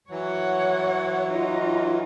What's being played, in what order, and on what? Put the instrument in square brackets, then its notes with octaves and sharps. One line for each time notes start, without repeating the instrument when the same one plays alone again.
[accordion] E3 F#3 [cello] C#5 F#5
[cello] D#4 F4